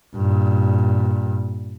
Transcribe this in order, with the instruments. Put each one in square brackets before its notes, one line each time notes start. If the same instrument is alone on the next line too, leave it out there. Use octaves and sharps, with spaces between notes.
[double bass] G2 A#2